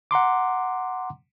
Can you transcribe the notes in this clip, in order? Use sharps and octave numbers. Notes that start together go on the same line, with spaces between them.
F#5 A#5 C6 D6